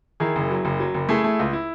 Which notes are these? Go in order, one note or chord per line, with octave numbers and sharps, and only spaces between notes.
D#3 E4 G#4
F#1
F#3
F#1
F#3
F#1
A3 E4 G#4
A3
C#2
E4